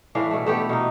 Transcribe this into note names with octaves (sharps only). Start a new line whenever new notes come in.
A2 E3 D4 F5
B2 A3
A3 B3 G4 A4
B2 D#4